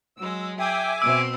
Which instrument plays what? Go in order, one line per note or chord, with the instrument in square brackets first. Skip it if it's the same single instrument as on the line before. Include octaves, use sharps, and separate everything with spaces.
[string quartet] F#3 G#3 [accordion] E6
[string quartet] G#4 [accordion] E5 G#5 D6 [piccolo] G5
[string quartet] B2 C4 [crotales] E6 [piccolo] D7